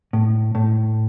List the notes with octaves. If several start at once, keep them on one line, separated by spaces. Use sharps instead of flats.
A2
A2